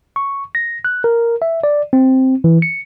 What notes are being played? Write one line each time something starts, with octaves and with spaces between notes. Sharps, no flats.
C#6
A#6
F#6
A#4
E5
D5
C4
E3
C#7